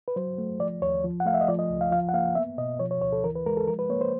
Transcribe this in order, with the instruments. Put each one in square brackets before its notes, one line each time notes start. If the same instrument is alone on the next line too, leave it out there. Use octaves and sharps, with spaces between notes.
[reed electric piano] B4
F#3 C5
A3
F3 D5
D#2 C#5
F3
F#5
A3 F5
E5
D#5
F3 D5
D#5
C#2
F5
F3 F5
F#5
A#3 F5
B3 E5
B2 D#5
F3 C#5
C#5
D2 C#5
A4
E3 A#4
B4
G#3 A#4
A4
F3 A#4
B4
A#3 C#5
C5